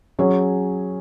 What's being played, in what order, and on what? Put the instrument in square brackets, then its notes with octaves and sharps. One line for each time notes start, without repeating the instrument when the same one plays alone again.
[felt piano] F#3 C#4 G#4 C#5